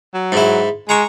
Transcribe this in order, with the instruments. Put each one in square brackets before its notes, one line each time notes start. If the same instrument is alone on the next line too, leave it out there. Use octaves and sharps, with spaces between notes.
[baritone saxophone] F#3
[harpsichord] G#2 E4
[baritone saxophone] G#3 [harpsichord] A#5 C#6